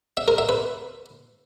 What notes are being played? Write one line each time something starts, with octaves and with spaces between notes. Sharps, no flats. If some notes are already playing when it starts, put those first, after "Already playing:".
E5
A#4
E5
B4